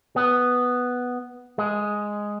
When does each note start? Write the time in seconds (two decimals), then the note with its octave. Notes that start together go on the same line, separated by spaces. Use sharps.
0.16 B3
1.58 G#3